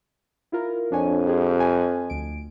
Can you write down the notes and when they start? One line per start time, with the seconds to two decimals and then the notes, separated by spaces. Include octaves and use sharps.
0.52 E4 F4 A#4
0.92 F2 D4 C#5 G#5
1.27 F4 G4 G#4
1.60 G#5
2.10 D2 D7